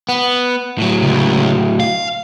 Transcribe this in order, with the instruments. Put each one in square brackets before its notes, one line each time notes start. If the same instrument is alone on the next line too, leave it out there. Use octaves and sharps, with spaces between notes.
[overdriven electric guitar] B3
A2 F#3
[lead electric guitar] C#2
F5